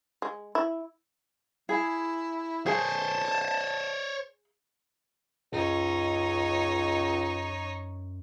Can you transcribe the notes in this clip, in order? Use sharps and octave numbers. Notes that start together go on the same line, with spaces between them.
G#3
E4
E4 G#4
G#4 C5 C#5 A5
C#2 F#2 D#4 C#5